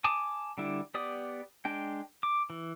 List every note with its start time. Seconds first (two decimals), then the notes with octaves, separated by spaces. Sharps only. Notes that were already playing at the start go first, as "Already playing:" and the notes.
0.04 G#5 A5 D6 D#6
0.58 D3 G3 D4 E4
0.94 B3 G4 D5 D#6
1.65 G#3 D4 G5
2.23 D6
2.50 E3